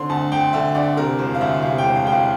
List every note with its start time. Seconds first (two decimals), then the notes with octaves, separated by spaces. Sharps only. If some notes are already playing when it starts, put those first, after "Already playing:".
Already playing: D3 C4 C6
0.09 D2 A5
0.32 D2 G5
0.53 D3 E5
0.75 D2 D5
0.97 C3 A#4
1.19 E1 C5
1.34 F5
1.41 D2 E5
1.62 C3 F5
1.78 G5
1.84 E1
1.96 F5
2.06 E1 G5
2.12 F5